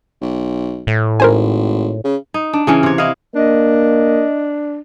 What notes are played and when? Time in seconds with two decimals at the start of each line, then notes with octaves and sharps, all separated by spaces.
0.21 B1
0.87 A2
1.20 G#1 A#4 C5 G#5
2.04 C#3
2.34 D#4
2.53 D4
2.67 C#3 E3 C#4
2.83 C3 C#5
2.98 E4 D#5 F5
3.36 A#3 D4 D#5